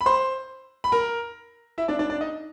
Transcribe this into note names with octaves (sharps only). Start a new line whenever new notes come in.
B5
C5 C6
B5
A#4 A#5
E4 E5
D4 D5
D4 D5
D4 D5
D#4 D#5